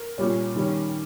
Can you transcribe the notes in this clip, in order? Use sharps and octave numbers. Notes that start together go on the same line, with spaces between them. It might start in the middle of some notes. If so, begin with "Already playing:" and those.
Already playing: A#4
A#2 G3 C#4
D#3 G3 C#4